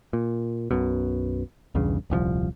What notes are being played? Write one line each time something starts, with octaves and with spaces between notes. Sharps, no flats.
A#2
B1 F#2 B2
B1 E2 G2 C#3
D#1 C2 D3 F3